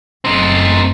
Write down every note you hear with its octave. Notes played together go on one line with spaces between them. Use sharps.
F#1 A3 C4 D#4